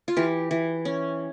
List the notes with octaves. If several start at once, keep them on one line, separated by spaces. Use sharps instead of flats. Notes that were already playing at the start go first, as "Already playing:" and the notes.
F4
E3 G4
E3
C#4